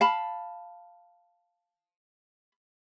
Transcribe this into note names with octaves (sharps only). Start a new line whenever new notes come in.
F5 A5 B5